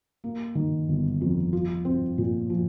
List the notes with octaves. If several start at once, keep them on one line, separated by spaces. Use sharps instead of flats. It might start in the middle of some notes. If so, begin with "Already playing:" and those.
A#3
D#3
G1
F2
F4
C4
A#2
F3